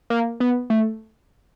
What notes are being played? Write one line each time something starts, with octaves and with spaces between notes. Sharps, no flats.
A#3
B3
A3